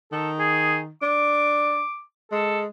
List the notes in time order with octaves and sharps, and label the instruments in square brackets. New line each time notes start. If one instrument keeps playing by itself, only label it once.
[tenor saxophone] D#3 [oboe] A4
[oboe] G#4
[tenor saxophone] D4 [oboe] D6
[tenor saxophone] G#3 [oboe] A4